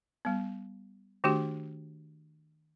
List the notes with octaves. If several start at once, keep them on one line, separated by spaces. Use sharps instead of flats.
G3 B3
D#3 A3 D4 F#4 G4